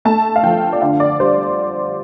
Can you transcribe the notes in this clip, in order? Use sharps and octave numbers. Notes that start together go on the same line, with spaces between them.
A3 A5
F5
F3 G5
D5
D3 F5
D5
G3 C5